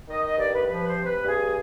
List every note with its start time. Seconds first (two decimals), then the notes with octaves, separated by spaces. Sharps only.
0.08 D#3 D#5
0.23 D#5
0.37 G2 D5
0.52 B4
0.66 F3 B4
0.86 C5
0.96 C3
1.05 B4
1.24 G2 G#4